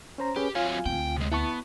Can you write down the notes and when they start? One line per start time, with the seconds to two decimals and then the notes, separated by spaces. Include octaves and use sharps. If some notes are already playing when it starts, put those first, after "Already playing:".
0.18 C#4 C5 A#5
0.36 C#4 G4 G#4 B4
0.55 F#3 C4 F4 C#5 F5 G#5
0.86 D2 C4 G5
1.16 C3 G#3
1.32 B3 E4 A5 C#6